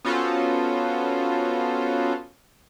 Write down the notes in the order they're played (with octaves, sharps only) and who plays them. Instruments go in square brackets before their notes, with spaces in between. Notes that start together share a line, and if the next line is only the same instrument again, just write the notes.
[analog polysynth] B3 C#4 F4 F#4 A4 C5